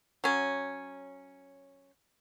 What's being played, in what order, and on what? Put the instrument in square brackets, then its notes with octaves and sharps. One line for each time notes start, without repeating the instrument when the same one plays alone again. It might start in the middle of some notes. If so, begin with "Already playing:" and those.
[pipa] F#3 C#4